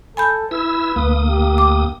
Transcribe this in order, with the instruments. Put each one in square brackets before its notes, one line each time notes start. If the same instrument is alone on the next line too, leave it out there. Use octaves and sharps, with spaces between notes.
[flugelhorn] A4 [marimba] G#5 B5 G6
[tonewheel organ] E4 E6 [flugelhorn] B4
[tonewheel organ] D2 A#3 D#6
[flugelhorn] G4
[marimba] D6